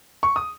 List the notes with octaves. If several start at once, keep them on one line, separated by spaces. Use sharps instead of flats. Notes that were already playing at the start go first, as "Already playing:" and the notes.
C#6
D#6